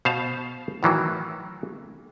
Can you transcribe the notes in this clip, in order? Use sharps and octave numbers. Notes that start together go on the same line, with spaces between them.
B2 C5 F5 A5
A2 D#3 E3 F#3